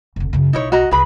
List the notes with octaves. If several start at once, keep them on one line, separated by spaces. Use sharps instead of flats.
F1 D2
F#2 C#3
B1 D#4 E4 C#5
F#4 D#5 A#5
C2 G#4 B4 B5